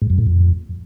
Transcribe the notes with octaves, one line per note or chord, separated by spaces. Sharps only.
G#2
F#2
A2
F2